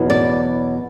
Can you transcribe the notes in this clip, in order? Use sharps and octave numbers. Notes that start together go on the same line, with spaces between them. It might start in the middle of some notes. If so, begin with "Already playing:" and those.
Already playing: E2 B2 F#3 B3
D5